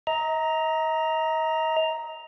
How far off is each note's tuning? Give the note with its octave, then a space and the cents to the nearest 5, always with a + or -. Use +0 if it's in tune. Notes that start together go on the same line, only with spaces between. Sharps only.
D#5 +40 A#5 +0